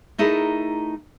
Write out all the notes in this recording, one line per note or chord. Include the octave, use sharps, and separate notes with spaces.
A3 D#4 E4 G#4 A#4